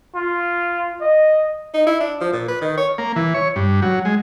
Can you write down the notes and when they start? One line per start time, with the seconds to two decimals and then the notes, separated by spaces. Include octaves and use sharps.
0.15 F4
1.01 D#5
1.74 D#4
1.87 E4
2.00 D4
2.21 F3
2.33 A#2
2.48 B4
2.61 D#3
2.77 C#5
2.98 A#3
3.16 E3
3.34 C#5
3.56 G2
3.82 F#3
4.05 G#3